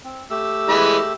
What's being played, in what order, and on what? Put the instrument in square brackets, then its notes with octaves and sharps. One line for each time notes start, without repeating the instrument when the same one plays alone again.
[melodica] C4
A3 G4 E6
[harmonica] E3 G#3 B5